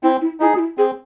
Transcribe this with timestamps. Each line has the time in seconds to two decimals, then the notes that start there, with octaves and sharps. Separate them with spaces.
0.03 C4 E4
0.21 E4
0.40 D#4 E4 G#4
0.56 F#4
0.59 E4
0.78 C4 G#4